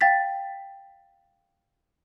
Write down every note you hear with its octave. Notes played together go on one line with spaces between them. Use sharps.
F5 G5 A6 B6